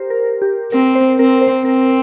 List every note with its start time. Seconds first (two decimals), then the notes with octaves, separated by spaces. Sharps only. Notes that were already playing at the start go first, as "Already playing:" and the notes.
Already playing: G4 A#4 C5
0.10 A#4
0.42 G4
0.72 C4 A#4
0.95 C5
1.19 C4 A#4
1.42 C5
1.65 C4 A#4